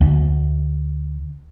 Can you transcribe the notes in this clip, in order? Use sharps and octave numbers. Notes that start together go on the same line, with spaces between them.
D2